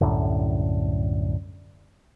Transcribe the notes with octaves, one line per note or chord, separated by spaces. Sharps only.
C2 F#2 A2 D3